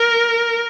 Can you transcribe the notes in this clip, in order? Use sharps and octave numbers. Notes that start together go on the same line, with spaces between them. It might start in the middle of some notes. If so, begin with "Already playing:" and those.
Already playing: A#4